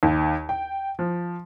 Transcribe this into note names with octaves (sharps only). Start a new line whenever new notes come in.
D#2
G5
F3